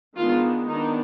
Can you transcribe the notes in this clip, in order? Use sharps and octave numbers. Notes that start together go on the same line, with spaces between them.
D#3 G#3 B3 D4 F4
D#3 B3 D4 D#4